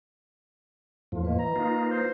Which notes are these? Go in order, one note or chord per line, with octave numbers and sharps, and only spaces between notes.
E2 A2 F3
A#3 B4 D#5
E3 A#5
A#3 D#4 F4
B4
C5